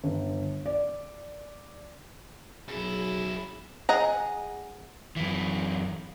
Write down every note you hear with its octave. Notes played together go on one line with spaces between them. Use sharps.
G1
D5
B1 F#2 F#3 E4 G#4
G#4 D#5 F#5 A#5
F#2 E3